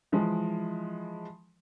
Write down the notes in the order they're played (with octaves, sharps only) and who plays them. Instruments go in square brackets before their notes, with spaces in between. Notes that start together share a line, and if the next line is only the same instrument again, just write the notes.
[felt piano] E3 F3 G#3